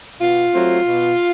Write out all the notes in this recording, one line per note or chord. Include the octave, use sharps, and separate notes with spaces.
B2 F4
F#3 A3 C4
B2